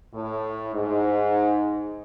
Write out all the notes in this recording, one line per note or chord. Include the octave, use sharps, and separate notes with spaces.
A2
G#2